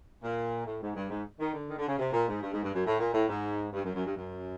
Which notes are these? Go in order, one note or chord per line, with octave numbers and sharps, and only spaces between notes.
A#2
A2
G#2
G2
G#2
D#3
D3
D#3
D3
C#3
C3
A#2
G#2
G2
G#2
G2
F#2
A2
A#2
A2
G#2
G2
F#2
F#2
G2
F#2